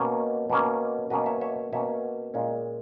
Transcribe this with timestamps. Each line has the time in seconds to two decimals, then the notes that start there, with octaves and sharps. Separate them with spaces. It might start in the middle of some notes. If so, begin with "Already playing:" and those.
Already playing: B2 A#3 C#4 C#5
0.50 B2 A#3 C#4
1.10 B2 A#3 C#4 B4 D#5
1.26 C#5 E5
1.41 C#5 E5
1.73 B2 A#3 C#4 C#5 E5
2.34 A#2 G#3 C#4